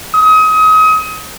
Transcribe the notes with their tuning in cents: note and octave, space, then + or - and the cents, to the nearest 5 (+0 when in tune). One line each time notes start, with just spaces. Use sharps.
D#6 +30